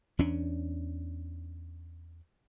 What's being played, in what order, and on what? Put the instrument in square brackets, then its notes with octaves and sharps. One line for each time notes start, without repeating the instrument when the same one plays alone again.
[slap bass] E2 C#4 D4